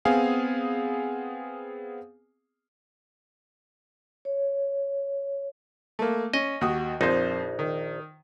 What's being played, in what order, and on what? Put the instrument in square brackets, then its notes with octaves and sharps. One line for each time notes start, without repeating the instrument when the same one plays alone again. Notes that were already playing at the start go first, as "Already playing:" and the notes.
[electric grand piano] B3 C4 G#4 F5 G#5
[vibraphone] C#5
[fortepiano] A3 A#3
[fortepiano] C#4 [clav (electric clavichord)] D#5
[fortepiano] D#2 F#4 D#6
[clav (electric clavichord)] A#1 D#4 [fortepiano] F2 C5
[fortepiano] D#3